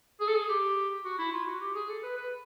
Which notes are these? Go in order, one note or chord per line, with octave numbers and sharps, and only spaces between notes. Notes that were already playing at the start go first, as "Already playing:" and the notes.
G#4
A4
G#4
G4
F#4
E4
F4
F#4
G4
G#4
A4
B4
B4